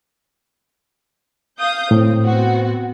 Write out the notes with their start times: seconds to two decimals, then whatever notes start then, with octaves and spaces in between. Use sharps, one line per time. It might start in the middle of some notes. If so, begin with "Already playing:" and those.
1.59 F5 D#6 G6
1.91 A2 C4
2.25 B3 C4 F#4